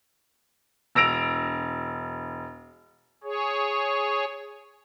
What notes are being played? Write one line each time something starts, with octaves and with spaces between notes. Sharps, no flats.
E1 E6 A#6 D7 F7
G#4 C#5